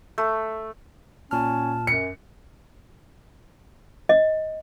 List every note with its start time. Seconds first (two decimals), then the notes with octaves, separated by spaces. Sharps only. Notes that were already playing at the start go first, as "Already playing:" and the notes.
0.18 A3
1.31 A#2 C#4 A5 F6
1.87 F#2 C#7
4.09 D#5